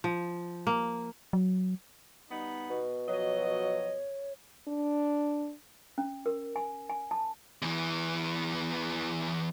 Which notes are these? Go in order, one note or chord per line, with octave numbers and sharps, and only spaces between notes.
F3
A#3
F#3
G3 B3 D#4
B2
F3 F#3 C#5 D#5
D4
C#4
A#4
G#5
G#5
A5
E2 E3